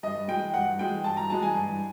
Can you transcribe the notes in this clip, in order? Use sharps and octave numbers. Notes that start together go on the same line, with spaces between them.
G2 D#5
E3 G#3 G5
G2 F#5
E3 G#3 G5
G2 A5
A#5
E3 G#3 A5
G#5
G2